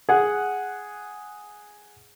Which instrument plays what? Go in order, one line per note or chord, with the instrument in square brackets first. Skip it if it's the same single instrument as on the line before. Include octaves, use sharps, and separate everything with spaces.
[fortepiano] G#4 F#5